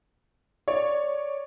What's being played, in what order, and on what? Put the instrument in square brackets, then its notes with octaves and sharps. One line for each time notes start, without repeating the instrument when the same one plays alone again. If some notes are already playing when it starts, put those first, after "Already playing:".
[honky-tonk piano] C#5 [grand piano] D5